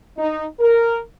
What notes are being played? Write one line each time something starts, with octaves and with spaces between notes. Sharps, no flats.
D#4
A#4